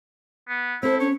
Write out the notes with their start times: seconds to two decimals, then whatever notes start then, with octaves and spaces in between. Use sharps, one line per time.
0.48 B3
0.83 C4 E4 A4 C5
1.00 C#4 C#5